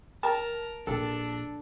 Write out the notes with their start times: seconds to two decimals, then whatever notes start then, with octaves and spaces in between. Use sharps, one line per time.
0.23 A#4 A5 A#5
0.87 A#1 D4 A4